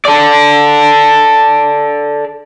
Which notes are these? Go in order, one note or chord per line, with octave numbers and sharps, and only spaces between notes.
A4 D5